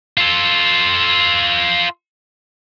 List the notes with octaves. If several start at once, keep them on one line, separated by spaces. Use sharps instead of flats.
F4 A4